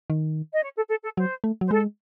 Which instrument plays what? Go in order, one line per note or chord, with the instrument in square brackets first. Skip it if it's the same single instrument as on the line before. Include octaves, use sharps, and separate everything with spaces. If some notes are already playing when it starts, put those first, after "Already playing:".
[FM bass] D#3
[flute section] D#5
C#5
A4
A4
A4
[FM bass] F#3 [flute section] C5
[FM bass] A3
[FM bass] F#3 [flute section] C5
[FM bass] G#3 [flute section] A4